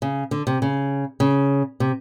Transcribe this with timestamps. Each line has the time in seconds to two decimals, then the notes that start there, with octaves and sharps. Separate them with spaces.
0.02 C#3
0.31 D3
0.47 C3
0.62 C#3
1.20 C#3
1.80 C3